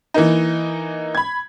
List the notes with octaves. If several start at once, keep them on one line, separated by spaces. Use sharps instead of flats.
E3 A#3 D#4
B5 G#6